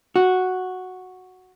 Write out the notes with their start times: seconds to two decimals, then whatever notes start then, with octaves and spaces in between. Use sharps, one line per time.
0.16 F#4